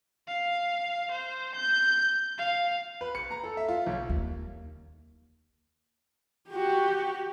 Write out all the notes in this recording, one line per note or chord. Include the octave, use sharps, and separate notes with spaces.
F5
C5
G6
F5
B4
C#7
A#5
A4
E5
F4
B1
D#2
F#4 G4